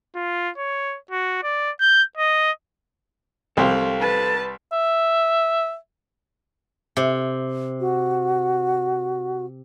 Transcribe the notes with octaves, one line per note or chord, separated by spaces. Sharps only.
F4
C#5
F#4
D5
G6
D#5
C2 C4 A4 F5
B4 A5
E5
C3
F#4